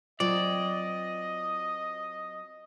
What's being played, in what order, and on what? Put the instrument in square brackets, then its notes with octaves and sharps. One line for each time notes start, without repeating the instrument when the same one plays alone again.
[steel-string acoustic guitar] F#3 C4 [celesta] F4 [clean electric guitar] D5 [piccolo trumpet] D#5